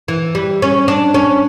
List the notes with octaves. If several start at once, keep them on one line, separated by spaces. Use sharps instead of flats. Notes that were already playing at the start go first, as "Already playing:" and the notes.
E3
G3
C#4
D4
C#4